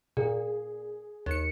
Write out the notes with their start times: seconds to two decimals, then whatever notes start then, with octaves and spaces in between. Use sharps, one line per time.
0.17 A#2 G#4
1.26 D#2 C#7